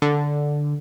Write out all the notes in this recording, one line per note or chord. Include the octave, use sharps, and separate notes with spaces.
D3